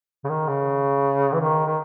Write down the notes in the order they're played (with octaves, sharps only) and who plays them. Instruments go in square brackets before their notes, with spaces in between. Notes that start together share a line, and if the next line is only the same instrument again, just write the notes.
[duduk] C#3
D#3
C#3
E3
D#3
D#3